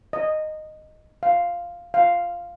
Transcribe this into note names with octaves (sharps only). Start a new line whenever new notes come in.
D#5
F5
F5